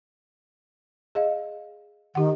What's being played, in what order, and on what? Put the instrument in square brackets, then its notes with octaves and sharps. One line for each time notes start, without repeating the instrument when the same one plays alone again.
[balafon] G#4 D#5 F5
[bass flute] D#3 [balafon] G4 F#5